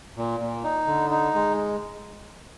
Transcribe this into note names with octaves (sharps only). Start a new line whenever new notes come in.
A#2
A#2
D#4
D3
D#4
G#3